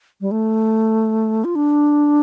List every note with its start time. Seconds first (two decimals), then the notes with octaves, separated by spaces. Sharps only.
0.21 G3
0.31 A3
1.44 F4
1.55 D4